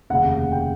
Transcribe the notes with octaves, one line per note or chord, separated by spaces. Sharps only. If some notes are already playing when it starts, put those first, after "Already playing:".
F1 D#2 C#3 F#5
G5